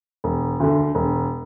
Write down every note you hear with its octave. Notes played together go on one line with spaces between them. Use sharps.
E1
D2 D3
E1